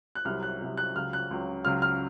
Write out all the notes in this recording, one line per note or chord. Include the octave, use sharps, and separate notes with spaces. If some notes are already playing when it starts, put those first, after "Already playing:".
F#6
C2 C3 F#3 F6
F#6
C2 C3 F#3
F#6
C#2 C#3 F#3 F6
F#6
C#2 C#3 F#3
C#2 C#3 F#3 F6
F6